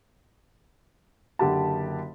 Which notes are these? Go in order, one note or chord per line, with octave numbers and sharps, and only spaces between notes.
F#1 D3 G4 A5